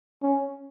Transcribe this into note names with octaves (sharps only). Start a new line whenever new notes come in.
C#4